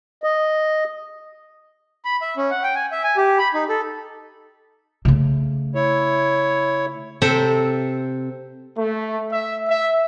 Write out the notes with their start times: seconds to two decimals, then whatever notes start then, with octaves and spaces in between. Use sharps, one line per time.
0.23 D#5
2.05 B5
2.22 E5
2.37 C#4
2.51 F#5
2.63 G5
2.75 G#5
2.92 E5
3.04 G#5
3.17 G4
3.39 B5
3.54 D#4
3.69 A4
5.05 C#3 A3
5.75 E4 C#5
7.22 C3 C4 A4 E5 G5 A#5
8.76 A3
9.31 E5
9.68 E5